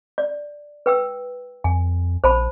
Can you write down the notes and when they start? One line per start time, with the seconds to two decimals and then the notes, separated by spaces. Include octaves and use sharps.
0.18 D5
0.86 B4 G5 E6
1.64 F2 G#5
2.24 A#1 C5 A5 B5